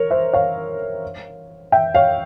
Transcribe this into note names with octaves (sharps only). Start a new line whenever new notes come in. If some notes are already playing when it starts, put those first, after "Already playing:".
Already playing: A#4 C#5
C5 E5
C#5 F5
E5 G5
C#5 F5